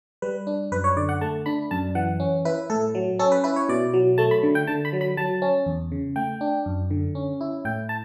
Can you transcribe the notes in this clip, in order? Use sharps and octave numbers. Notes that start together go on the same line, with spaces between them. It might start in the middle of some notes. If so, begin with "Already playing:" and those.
G3 B4
D4
F#2 B4
C#5
D3 D5
F#5
A3 A5
D4 B5
F#2 A5
E3 F#5
C#4
E4 B4
A2 A4
F#3
C#4 A4
B4
E4 B4
C#5
B2 D5
F#3
A3 A5
B5
D3
G5
D3 A5
B5
F#3
B5
F#3 A5
C#4
E2
C#3
A3 G5
D4
F#2
D3
C#4
E4
A2 G5
A5